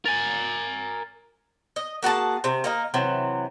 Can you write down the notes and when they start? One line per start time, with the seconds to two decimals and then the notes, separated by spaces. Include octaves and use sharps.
0.05 A#4 G#5 A6
1.76 D#5
2.03 A#3 F#4 G#4 A5
2.44 C3
2.64 A#3 D#4 A#4
2.94 C3 E3 F#3